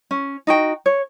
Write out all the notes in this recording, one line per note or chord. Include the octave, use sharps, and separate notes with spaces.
C#4
D#4 F#4 G5
C#5